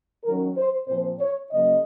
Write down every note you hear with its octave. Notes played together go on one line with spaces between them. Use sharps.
D#3 F#3 C#4 A#4
C5
A#2 F3 C4 C5
C#5
C#3 F#3 A#3 D#5